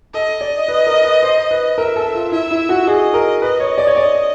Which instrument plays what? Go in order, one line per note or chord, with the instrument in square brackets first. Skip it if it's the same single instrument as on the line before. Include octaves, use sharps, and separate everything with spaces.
[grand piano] A4 [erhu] D#5
[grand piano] D5
B4
A#4
B4
C5
B4
[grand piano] A#4 [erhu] E5
[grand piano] A4
F4
[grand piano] E4 [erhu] E5
[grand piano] E4
F#4
[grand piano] G#4 [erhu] D#5
[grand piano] A#4
[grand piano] B4 [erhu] D#5
[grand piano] C#5
D5
C#5
D5